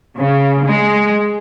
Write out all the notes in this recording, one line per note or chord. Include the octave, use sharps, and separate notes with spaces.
C#3
G#3